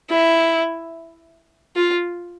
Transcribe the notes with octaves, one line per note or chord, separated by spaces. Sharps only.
E4
F4